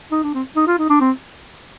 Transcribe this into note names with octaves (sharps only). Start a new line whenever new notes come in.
D#4
D4
C4
D#4
F4
D#4
D4
C4